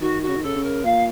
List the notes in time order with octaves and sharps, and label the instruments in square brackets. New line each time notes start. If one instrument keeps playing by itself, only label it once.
[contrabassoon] D#3 [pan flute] F#4
[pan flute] F#4
[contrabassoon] C#3
D#3
[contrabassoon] C#3 [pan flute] A4
[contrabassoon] C#3
[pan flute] A#4
[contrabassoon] A#2 [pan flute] F5